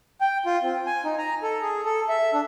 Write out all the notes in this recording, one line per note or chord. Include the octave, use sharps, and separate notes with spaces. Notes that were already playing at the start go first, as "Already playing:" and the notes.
G5
F4
C4
G#5
D#4
A#5
A4
G#4
A4
E5
D4